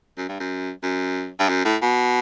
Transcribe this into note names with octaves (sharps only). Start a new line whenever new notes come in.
F#2
G2
F#2
F#2
G2
F#2
A2
B2